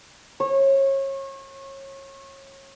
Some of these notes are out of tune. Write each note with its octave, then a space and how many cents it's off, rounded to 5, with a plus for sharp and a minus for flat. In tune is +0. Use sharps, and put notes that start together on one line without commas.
C#5 -30